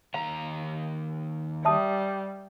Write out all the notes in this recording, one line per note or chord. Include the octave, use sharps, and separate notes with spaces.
D#2 F5 A#5
G3 E5 A5 D#6